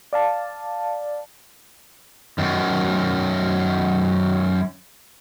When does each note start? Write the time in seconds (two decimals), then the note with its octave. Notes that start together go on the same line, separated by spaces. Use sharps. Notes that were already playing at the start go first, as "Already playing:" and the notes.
0.13 D5 F5 A5
2.38 F#2 D#3